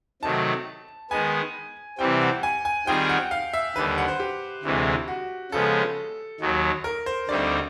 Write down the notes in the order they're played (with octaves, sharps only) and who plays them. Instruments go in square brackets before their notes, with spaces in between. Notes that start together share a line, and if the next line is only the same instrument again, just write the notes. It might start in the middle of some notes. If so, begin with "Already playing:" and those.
[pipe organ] C3 D#3 F#3 A3 [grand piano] A5
[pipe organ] D#3 G#3 B3 [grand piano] G#5
[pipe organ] C3 E3 G3 C4 [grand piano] G5
[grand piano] F#5
G#5
G#5
[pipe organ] D#3 G3 C4 F4 G#4 [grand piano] G5
[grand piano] F#5
F5
E5
[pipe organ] D#2 D3 G3 [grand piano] B4
[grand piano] F#5
C5
G4
[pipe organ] D2 C3 E3 G#3
[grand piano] F#4
[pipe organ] C#3 F3 G#3 B3 [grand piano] A4
[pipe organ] D#2 D#3 F#3
[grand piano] A#4
C5
[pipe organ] D2 D3 G3 C4 D#4 [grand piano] D5